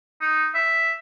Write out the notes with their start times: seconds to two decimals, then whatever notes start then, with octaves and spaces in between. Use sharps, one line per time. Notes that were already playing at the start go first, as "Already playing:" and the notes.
0.21 D#4
0.55 E5